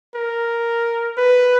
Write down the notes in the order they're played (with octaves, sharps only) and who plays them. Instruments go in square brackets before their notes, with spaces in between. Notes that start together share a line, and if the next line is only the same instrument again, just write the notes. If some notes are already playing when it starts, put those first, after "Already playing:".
[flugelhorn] A#4
B4